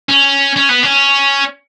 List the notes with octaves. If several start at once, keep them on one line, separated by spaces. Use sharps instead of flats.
C#4
C#4
B3
C#4